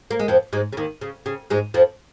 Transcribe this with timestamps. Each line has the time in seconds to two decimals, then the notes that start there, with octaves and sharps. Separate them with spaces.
0.11 A#3
0.19 G#3
0.28 F2 F3
0.53 G#2 G#3
0.73 C#3
0.77 D#2 D#3
1.01 C#3
1.26 C#3
1.50 G#2 G#3
1.74 F2 F3